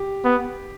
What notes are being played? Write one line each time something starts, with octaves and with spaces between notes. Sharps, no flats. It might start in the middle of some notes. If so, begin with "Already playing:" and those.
Already playing: G4
B3